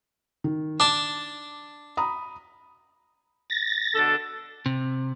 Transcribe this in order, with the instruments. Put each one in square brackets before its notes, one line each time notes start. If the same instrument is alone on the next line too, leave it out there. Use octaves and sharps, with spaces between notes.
[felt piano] D#3
[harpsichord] D4 A5 [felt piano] D6
[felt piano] A#5 B5 D#6
[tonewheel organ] A6 A#6
[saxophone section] B2 D3 A4
[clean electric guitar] C3